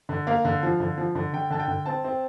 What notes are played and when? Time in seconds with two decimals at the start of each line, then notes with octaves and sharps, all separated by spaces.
0.09 D3
0.27 A#3 F5
0.45 D3
0.63 F3
0.80 D3
0.98 F3
1.15 D3
1.33 D3 G5
1.50 D3 A5
1.60 G5
1.68 D3
1.86 C4 A5
2.04 C4